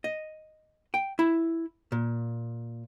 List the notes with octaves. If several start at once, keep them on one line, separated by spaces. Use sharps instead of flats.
D#5
G5
E4
A#2